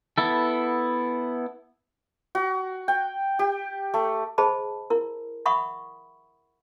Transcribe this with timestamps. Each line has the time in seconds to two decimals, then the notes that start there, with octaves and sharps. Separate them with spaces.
0.18 B3 E4 A4
2.35 F#4
2.88 G5
3.39 G4
3.94 A3
4.38 G#4 C5 D#5 A5 B5
4.90 E4 A#4
5.46 E5 F#5 B5 C#6 D#6